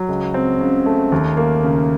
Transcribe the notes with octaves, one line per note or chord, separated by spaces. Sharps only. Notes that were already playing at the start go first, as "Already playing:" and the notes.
Already playing: F#3
C#2
C4
C#3
A3
D#2
A#3
C#3